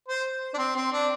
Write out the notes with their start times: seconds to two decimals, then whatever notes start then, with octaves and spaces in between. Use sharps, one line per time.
0.08 C5
0.54 D4
0.58 C4
0.75 C4
0.92 D4